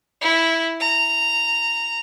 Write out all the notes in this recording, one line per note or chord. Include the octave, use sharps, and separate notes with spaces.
E4
A#5